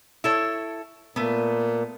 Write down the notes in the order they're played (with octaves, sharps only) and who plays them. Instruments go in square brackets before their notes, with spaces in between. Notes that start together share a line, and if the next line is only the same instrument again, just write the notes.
[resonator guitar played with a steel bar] E4 A4 C#5
[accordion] A#2 [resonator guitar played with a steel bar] A3 B3